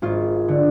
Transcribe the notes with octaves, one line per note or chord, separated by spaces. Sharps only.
G#1 F4
D3